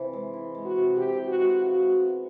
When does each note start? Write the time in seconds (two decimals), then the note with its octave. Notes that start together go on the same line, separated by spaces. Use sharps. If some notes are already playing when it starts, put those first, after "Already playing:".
Already playing: C3 E3
0.13 G#3
0.34 E3
0.55 G#3
0.65 F#4
0.76 C3
0.97 C3 G4
1.17 E3
1.27 F#4
1.38 G#3
1.59 F3 F#4
1.80 G#3
2.01 B3